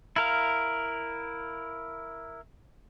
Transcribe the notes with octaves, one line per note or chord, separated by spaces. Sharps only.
E4 A#4 F5